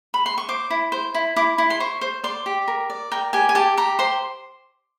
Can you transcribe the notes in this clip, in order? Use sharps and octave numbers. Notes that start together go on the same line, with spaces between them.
B5
C6
C#6
C5 D6
E4
C5
E4
E4 D6
E4
C6
C5 C#6
C5
D5 C6
G4
A#4
D5
A#4 G5
G4 G#5
G#5
G4 A5
G4 A#5
C5 C6